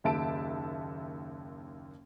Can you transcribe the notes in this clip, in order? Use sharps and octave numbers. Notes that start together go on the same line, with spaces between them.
F#1 D#2 E5 A5 D7